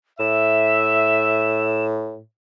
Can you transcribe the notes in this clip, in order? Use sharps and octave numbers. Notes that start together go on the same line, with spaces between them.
A2 E5 E7